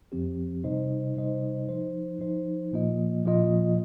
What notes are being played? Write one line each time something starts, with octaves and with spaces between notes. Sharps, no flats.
F2 F3 C4 G4
C3 G3 D#4 C5 D#5
C3 G3 D#4 C5 D#5
F3 D#4 C5
F3 D#4 C5
A#2 F3 A#3 F4 D#5
A#2 F3 A#3 F4 D#5